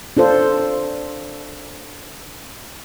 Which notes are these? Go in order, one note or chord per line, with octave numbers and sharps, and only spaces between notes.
D4 F4 A4 C5